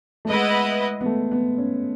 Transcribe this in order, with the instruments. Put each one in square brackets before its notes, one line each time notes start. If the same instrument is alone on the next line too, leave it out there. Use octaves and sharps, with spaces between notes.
[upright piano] A3
[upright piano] G#3 [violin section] B3 E4 B4 D#5
[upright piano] B3
A3
B3
C#4